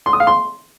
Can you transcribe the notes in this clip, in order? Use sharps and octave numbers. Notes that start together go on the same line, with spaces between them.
C6
D#6
F5
C6